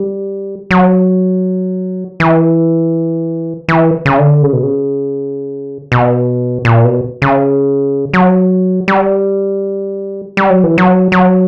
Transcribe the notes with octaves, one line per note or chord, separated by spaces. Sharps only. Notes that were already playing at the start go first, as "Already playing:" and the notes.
Already playing: G3
F#3
E3
E3
C#3
D3
C#3
B2
C#3
B2
A#2
B2
C#3
F#3
G3
G3
F#3
E3
F#3
F#3